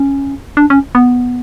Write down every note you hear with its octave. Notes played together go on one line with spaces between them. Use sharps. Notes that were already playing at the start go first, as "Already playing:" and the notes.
Already playing: C#4
D4
C#4
B3